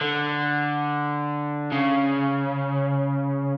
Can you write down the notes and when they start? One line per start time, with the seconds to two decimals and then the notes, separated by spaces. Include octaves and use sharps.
0.01 D3
1.72 C#3